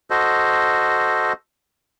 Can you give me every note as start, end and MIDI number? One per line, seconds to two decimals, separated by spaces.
0.10 1.33 66
0.10 1.33 69
0.10 1.33 72
0.10 1.33 75